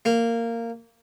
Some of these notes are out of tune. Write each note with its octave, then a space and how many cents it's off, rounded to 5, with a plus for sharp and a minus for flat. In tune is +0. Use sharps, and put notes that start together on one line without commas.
A#3 -15